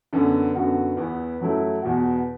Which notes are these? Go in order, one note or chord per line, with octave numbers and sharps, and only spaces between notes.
F#2 D3 B3
F#2 D3 B3 F#4
E2 E3 B3
F#2 F#3 A3 E4
E2 B2 B3 F#4